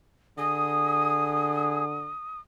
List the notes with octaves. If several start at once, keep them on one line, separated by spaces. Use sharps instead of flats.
D3 G#4 D#6